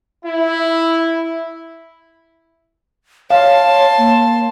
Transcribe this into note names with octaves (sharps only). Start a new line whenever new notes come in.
E4
C#5 F5 A5 C6
A#3